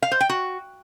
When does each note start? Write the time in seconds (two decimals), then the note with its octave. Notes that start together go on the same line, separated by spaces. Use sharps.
0.02 F5
0.11 C5
0.20 G5
0.29 F#4